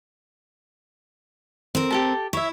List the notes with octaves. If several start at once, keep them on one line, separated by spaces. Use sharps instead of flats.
C4 A#4
G4 A4 A5
E4 C#5 E5